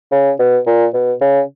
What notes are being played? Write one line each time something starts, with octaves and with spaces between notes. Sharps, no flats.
C#3
B2
A#2
B2
C#3